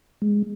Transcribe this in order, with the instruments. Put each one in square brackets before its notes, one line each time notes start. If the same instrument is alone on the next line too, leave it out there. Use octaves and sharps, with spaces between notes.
[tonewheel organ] G#3